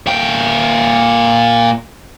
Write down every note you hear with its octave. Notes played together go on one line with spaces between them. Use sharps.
A#2 G5